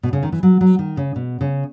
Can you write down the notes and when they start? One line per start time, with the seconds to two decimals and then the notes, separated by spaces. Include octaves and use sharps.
0.03 B2
0.13 C#3
0.23 D#3
0.32 E3
0.43 F#3
0.61 F#3
0.79 D#3
0.97 C#3
1.16 B2
1.41 C#3